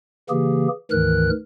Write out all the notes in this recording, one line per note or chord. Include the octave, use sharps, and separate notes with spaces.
C#3 E3 A#3 G4 G#4
D2 G#2 D#3 E3 A#4 F#6